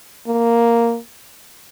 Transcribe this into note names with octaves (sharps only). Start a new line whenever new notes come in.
A#3